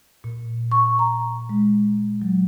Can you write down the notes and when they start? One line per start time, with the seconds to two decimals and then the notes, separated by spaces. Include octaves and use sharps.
0.24 A#2
0.72 C#6
0.99 A#5
1.49 G#3
2.22 F#3